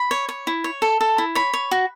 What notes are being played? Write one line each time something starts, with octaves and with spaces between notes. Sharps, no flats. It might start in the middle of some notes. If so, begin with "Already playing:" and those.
Already playing: B5
C#5
C#5
E4
C#5
A4
A4
E4
C#5 B5
C#5
F#4